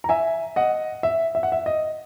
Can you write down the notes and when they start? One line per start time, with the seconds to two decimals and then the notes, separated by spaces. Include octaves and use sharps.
0.04 A#5
0.09 E5 G#5
0.56 D#5 F#5
1.03 E5
1.35 E5
1.43 F#5
1.52 E5
1.66 D#5